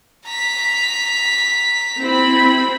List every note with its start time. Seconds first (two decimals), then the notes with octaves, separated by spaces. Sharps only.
0.27 A#5 B6
1.99 C4 E4 B5